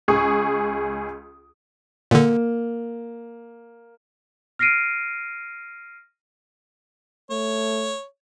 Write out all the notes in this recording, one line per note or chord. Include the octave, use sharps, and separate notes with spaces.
C#2 G#4 C#6 D#6
A#2 D3 A#3
F6 A#6 C7 D7 D#7
A3 C#5